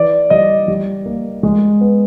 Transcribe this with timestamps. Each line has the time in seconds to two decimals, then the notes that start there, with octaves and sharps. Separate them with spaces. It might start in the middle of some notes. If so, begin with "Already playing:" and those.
Already playing: E3 D5
0.30 G3 D#5
0.68 G3
1.06 A#3
1.43 G#3
1.81 B3